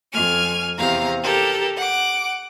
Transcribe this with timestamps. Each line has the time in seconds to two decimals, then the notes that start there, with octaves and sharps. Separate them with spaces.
0.12 F2 G#5 F6
0.77 E2 C3 F5 A#5
1.23 G4 A4 A#4
1.76 F#5 D6